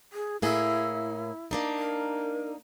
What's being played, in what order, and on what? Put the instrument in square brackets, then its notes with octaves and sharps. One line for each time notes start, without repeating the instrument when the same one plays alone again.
[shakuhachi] G#4
[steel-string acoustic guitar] A2 A#3 G#4 [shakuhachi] E4
[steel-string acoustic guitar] A#3 D4 D#4
[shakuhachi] A#4